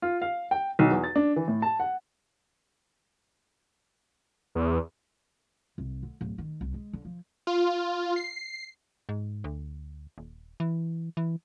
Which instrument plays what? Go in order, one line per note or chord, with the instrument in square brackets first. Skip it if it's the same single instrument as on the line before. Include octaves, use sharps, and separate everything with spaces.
[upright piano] F4
F5
G5
B1
E2
A6
D4
E3
A2
A5
F#5
[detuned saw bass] E2
[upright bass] C2
D2
D1
D#3
C2
G#3
D3
F3
[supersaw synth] F4
C7
[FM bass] G#2
D2
D#1
E3
E3